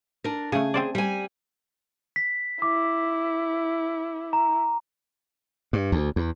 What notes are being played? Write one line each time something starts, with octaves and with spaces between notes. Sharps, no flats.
D4 A#4
C#3 A3 G#4
C4 C5 D5
G3 G#5
B6
E4 D6
A#5
G2
D2
E2